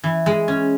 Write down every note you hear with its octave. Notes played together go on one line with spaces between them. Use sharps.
E3
G#3
C#4